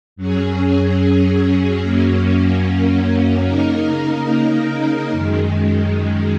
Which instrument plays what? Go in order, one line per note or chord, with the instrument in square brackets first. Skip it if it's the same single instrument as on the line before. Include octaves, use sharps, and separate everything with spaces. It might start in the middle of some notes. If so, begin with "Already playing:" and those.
[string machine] F#2 F#3 C#4 G#4
F#2 F#3 A#3 C#4
C#3 A#3 D#4 A#4
F#2 D#3 G#3